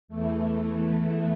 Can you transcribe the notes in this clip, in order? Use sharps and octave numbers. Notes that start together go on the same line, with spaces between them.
E2 E3 A3